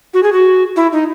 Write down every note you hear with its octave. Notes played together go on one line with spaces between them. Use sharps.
F#4
G#4
F#4
E4
D#4